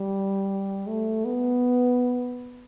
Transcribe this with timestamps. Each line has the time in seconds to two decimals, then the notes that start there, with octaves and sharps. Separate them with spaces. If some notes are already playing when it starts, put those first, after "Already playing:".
Already playing: G3
0.87 A3
1.25 B3